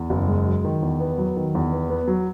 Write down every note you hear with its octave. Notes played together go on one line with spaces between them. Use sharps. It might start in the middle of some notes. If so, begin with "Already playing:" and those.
Already playing: E2
F#1
G#3
F#3
D#3
E2
B3
F#3
D#3
E2
B3
B3
F#3